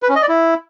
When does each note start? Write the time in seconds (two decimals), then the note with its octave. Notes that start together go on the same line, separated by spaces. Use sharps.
0.03 B4
0.09 C#4
0.16 D#5
0.22 D5
0.29 E4